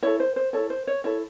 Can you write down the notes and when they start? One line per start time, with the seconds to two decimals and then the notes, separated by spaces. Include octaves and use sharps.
0.03 E4 A4 C#5
0.20 C5
0.36 C5
0.53 E4 A4 C#5
0.70 C5
0.87 C#5
1.04 E4 A4 C#5